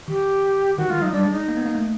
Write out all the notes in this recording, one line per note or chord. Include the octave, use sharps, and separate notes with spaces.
D#3 G4
D#3 F#4
G#3 F4
F#3 D#4
G3 D4
G#3
D#4
A#3
B3
A#3
A3